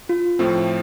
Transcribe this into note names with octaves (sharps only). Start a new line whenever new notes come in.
F4
A2 F3 A3 C4